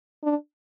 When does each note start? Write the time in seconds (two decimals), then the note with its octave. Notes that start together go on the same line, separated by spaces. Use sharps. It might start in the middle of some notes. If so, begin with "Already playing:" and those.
0.24 D4